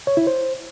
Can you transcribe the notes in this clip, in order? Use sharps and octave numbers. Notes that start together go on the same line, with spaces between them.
C#5
E4
C5